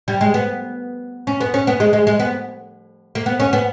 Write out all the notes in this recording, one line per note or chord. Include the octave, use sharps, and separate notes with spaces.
G3
G#3
B3
C#4
B3
C#4
B3
G#3
G#3
G#3
B3
A#3
B3
C#4
B3